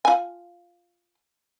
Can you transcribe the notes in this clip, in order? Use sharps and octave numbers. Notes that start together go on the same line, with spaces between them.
F4 G#5